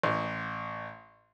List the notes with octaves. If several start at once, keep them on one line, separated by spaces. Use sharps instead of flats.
A1